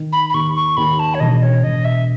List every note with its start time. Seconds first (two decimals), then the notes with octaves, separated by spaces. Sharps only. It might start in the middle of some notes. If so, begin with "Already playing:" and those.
Already playing: D#3
0.12 B5
0.30 B5
0.33 D#2 C#6
0.55 C#6
0.77 D#2 B5
0.99 A5
1.14 C#5
1.20 E1 D#5
1.42 C#5
1.63 E1 D#5
1.85 E5